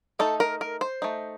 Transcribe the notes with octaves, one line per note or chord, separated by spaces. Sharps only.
A3 D#4 A4
A#4
A#4
C5
A3 D#4